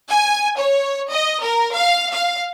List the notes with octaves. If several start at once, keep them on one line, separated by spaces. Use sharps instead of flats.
G#5
C#5
D#5
A#4
F5
F5